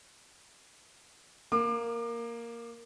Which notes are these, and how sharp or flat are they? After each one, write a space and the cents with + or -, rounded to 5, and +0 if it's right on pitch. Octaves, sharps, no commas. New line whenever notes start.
A#3 +0 D6 +30